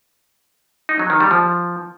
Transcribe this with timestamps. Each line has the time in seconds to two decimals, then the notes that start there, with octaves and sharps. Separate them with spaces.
0.89 D#4
0.99 F#3
1.10 D#3
1.20 G3
1.31 F3